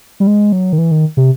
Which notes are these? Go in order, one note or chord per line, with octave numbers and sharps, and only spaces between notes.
G3
G#3
F#3
D#3
E3
D#3
C3